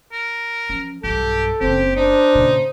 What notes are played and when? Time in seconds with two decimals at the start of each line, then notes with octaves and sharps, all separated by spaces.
0.12 A#4
0.69 F3 C#4
1.04 B1 G2 G4 A4
1.61 F#1 C#3 C4 G4
1.96 D4 D#4 C5
2.35 A#2 C#3